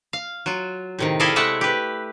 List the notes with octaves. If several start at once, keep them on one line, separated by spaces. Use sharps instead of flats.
F5
F#3 F4
A2 C3 D#3
E4 G#4 A4 D5 D#5 F5
G#3 A3 D5 E5 F#5
G4 B4